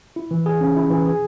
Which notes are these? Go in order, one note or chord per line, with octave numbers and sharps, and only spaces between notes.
E4
E3
G#4
C#4
E4
E3
G#4